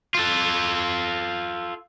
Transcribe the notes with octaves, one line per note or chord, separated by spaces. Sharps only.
F4 A4